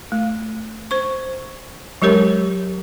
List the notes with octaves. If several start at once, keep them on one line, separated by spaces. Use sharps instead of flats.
A3
C5 C#6
F#3 G#3 G4 A#4 C#5